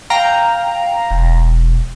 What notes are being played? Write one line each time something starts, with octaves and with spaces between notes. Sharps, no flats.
F5 G5 A#5
E1